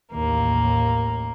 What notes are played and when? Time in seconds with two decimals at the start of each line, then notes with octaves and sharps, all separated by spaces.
0.12 A1 D#2 A2 A#3